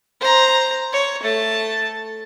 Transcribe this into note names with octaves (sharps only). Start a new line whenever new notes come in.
C5 A#5
C#5
A3 A5